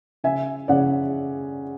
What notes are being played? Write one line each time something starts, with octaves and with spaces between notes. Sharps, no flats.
C#3 E5 G#5
C#3 D5 F#5